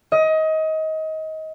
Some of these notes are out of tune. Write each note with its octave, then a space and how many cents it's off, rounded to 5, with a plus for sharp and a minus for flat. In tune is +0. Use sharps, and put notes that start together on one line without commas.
D#5 +25